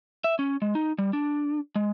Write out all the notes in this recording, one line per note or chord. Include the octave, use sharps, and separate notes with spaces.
E5
C#4
G#3
D#4
G3
D4
G#3